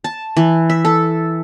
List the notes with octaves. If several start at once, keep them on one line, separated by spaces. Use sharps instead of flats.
A5
E3
E5
A4